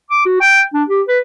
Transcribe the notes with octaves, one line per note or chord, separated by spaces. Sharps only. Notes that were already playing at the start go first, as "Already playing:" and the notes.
D6
F#4
G5
D4
G4
B4